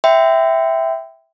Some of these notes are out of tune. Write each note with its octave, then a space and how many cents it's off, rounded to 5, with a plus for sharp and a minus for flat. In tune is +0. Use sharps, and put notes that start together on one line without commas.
E5 +0 G5 +0 C6 -40